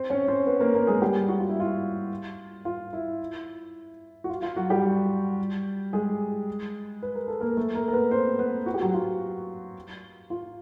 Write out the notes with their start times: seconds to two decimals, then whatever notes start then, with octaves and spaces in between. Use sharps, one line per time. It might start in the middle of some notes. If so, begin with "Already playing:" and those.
Already playing: C4 C5
0.10 C#4 C#5
0.28 C4 C5
0.47 B3 B4
0.60 A#3 A#4
0.74 A#3 A#4
0.87 G#3 G#4
1.02 G3 G4
1.29 F#4
1.39 F4
1.49 E4
1.60 F4
2.65 F4
2.93 E4
4.24 F#4
4.29 F4
4.42 F4
4.56 F#3 F#4
4.70 G3 G4
5.93 G#3 G#4
7.03 B4
7.16 A#4
7.28 A4
7.41 A#3 A#4
7.57 A3 A4
7.75 A#3 A#4
7.88 A#4
7.93 B3 B4
8.11 C4 C5
8.39 B3 B4
8.66 F#4
8.74 G4
8.81 F#3 F#4
8.94 F4
10.30 F4